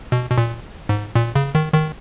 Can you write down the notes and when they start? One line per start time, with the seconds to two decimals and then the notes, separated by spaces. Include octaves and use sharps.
0.12 B2
0.30 B2
0.38 A#2
0.89 G#2
1.15 A#2
1.36 C#3
1.55 D#3
1.74 D#3